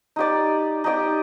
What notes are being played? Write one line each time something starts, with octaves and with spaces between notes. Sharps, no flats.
D#4 G4 D5
D#4 G4 D5